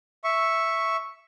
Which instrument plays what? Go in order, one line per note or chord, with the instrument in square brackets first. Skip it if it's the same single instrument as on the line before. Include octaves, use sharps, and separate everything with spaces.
[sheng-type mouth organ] E5 C#6